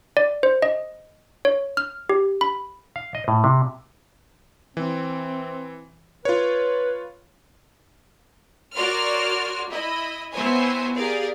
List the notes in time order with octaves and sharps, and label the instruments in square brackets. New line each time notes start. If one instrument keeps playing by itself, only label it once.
[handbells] D5
C5
D#5
C#5
F6
G4
B5
[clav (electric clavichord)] F5
D#5
A2
C3
[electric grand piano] E3 [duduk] C4
[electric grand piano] F4 C#5 [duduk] B4
[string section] F#4 A#4 C#5 D5 C6 F6
E4 D#5 B5
B3 C4 E4 C5 C#5 G#5
G4 G#4 A#4 D5 F5